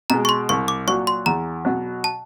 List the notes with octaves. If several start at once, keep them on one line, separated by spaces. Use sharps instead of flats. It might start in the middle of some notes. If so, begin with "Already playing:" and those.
B2 G#3 A#5
C#6
C6
C2 C#6
D6
A#2 F#3 C#6
C6
E2 A#5
B2 F#3
A5